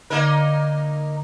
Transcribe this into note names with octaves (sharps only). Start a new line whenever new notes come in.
D3 A#3 D#4 A#4